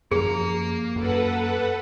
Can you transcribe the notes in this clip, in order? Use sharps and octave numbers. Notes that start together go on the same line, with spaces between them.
F#2 F3 A#3 G#4 A#5
F#2 A4 B4 F#5